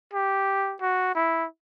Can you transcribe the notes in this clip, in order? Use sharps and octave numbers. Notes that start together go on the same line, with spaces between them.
G4
F#4
E4